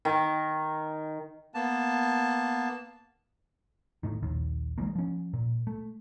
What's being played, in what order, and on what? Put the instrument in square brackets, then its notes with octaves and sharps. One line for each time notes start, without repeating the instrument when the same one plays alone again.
[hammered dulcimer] D#3
[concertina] A#3 B3 A5
[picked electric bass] A2 D#3
A#1 D#2 D#3
E3 G3 G#3 A#3
F3 C#4
A#2
A3